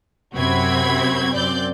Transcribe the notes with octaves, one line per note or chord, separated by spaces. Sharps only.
F#2 C3 C4 F#4 B5 G#6
F#2 C4 D5 G6